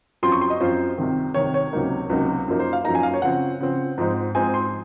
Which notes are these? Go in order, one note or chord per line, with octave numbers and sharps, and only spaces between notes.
F#2 F3 C4 F4 C6
C#6
C6
D#5
F#2 F3 C4 F4 C5
C2 C3 D#3
C2 C3 D#3 C#5
C#5
C#2 C3 F#3 A#3 D#4
C#2 C3 F#3 A#3 D#4
F#2 F3 A#3 D#4
C5
F5
F#2 F3 A#3 D#4 A#5
G#5
F5
C#5
C#3 F3 C4 F#5
C#3 F3 C4
G#2 F3 G#3 C4 D#4
G#2 F3 G#3 C4 D#4 G#5
C6